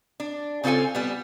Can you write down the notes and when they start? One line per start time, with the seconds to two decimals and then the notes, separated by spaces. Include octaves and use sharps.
0.20 D4
0.64 C#3 C4 F4 A4 G#5
0.95 G3 B3